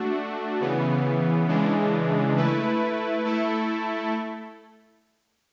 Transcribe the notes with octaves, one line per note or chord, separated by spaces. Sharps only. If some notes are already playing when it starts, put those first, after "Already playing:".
Already playing: A3 D4 F#4
C#3 E3 B3
C#3 E3 G#3 D4
A3 E4 B4
A3 E4 A4